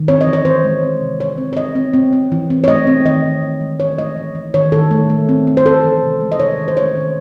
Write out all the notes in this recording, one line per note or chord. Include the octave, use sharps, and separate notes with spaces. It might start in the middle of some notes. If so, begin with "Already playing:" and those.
Already playing: D#3
C4 C#5
D#5
E3
C#5
C4 C5
G#3
C4
C3
C3 C#5
C4
C#5
C4 D#5
C4
C4
C4
E3
C4
C#5
A3 D#5
C4
D#3 D#5
D#3
D#3
G#3
E3 C#5
A3 D#5
E3
E3
D#3 C#5
D#3 A4
A3
A3
C4
C4
C5
C4 A4
E3
C3
G#3
D#5
C3 C#5
D#3
C5
A3 C#5
D#3